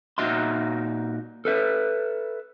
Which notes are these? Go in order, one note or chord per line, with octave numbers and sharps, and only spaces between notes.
A#2 D#4 F#4 E5 C6
A4 B4 E5